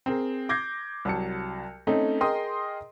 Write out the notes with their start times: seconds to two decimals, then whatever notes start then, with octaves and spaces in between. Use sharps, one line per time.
0.06 C4 G#4 A#4
0.49 D6 G6 G#6 A#6 C7
1.05 C2 F#3 A5 C#7
1.87 A3 C4 C#4 D#4
2.20 G#4 A#4 D#5 G5 C6 D#6